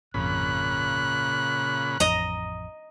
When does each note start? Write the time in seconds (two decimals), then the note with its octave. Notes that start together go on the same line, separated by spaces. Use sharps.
0.14 G#1 F2 A#2 C#3 B5 F#6
2.00 A1 F2 D#5 A#5